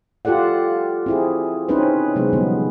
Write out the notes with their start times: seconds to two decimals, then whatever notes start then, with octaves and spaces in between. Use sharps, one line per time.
0.25 F4 G4 A4 D5 F#5
1.06 C4 E4 G#4
1.69 C4 C#4 D#4 B4 C5
2.16 C3 F#3 G#3 B3
2.33 D3 F3 G3 B3